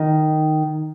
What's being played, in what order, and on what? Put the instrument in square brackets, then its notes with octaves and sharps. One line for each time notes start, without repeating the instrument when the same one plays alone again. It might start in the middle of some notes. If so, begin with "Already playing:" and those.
Already playing: [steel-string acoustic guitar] D#3